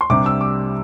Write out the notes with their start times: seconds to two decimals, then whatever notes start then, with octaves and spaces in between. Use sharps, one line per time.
0.01 C6
0.10 C2 C3 G3 D4 D6
0.26 E6
0.41 D6